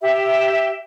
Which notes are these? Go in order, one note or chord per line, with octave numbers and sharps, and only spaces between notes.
G4 E5